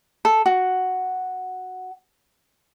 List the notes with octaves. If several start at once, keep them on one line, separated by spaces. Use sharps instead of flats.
A4
F#4